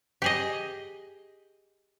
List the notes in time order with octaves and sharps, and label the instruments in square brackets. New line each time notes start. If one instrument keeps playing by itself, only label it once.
[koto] G4 G#4 D#5